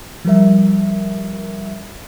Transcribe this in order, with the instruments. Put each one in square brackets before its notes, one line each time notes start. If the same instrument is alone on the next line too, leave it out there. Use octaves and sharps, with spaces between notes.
[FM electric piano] F3 G3 A#4 E5